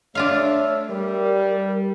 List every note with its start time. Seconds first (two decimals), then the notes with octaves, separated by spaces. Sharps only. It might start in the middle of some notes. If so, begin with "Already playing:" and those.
0.15 A3 D4 F4 A4 C#5 E5 F5
0.89 G3 A#4